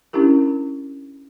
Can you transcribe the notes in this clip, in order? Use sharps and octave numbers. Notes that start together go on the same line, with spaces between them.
C#4 D4 E4 G4 A#4